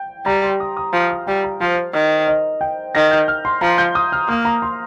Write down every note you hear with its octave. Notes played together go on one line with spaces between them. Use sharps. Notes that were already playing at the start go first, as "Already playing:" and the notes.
Already playing: G5
G3 A#5
C6
D#6
D#6
F3 F6
D#6
G3 G5
A#5
F3 C5
D#3
D#5
G5
D#3 A#6
G6
F6
C6
F3 A#5
G6
D#6
F6
A#3 D#6
A#5
C6